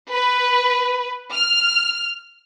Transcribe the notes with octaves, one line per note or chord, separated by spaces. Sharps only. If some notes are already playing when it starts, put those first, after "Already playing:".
B4
F6